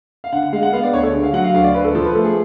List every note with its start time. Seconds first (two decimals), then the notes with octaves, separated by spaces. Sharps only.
0.24 F5
0.33 D3 F#5
0.43 F#5
0.53 G#3 F5
0.63 F#5
0.73 B3 F5
0.83 D5
0.93 D2 C#5
1.03 A4
1.14 D3 G#4
1.23 F5
1.33 F#3 F#5
1.44 F5
1.54 D2 F5
1.64 D5
1.74 D2 B4
1.84 A4
1.95 F3 A4
2.04 B4
2.15 A3 A4
2.25 G#4